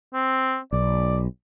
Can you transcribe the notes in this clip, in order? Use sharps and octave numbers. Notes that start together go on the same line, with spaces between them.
C4
B1 D5